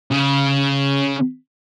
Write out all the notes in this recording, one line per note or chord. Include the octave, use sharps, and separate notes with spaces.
C#3